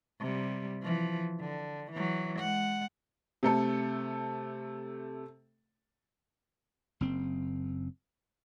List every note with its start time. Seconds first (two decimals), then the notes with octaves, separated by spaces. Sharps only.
0.20 C3 G3
0.81 E3 F3
1.41 D3
1.92 E3 F#3
2.39 G#3 F#5
3.43 C3 A3 A4
7.01 F#1 C4